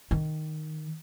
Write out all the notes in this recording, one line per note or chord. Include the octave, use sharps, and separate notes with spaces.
D#3